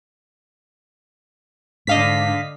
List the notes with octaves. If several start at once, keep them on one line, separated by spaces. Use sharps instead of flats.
G#2 D3 D4 D#5 F5 B6